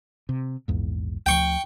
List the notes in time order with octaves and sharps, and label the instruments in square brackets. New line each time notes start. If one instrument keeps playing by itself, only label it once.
[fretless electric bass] C3
A#1 E2 G#2
[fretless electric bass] D2 F3 [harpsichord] G5 C#6